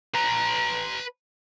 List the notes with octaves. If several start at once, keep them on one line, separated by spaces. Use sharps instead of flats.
B4 A#5